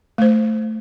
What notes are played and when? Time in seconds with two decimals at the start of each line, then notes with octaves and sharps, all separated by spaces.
0.18 A3 C5